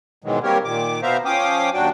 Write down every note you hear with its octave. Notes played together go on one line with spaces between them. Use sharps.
G#2 B2 D#3 E3 F#3 G#3
G3 A#3 C4 G4 A#4 C#5
A#2 D#3 D6
B2 B3 C5 E5 F5 A#5
F3 C#4 F5 G5 D6 D#6
D#2 F#3 D4 F#4 G5